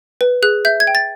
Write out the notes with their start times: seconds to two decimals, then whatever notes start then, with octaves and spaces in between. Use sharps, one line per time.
0.21 B4
0.42 G#4 F#6
0.65 E5 G6
0.80 G#6
0.87 G5
0.95 A6